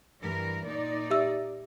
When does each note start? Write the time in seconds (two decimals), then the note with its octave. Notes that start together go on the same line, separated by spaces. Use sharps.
0.20 G2 E3 A#4
0.65 A#2 D#4 D5
1.10 G4 E5 E6